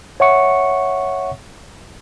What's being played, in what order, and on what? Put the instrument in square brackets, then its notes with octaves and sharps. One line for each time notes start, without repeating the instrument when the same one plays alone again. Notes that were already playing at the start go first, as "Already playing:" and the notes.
[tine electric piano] C#5 E5 F#5 C#6 C#7